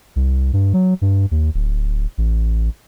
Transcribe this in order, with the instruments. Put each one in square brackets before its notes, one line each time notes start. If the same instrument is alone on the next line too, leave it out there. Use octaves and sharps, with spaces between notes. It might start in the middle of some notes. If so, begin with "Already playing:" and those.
[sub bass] C2
G2
F#3
G2
D#2
D1
A1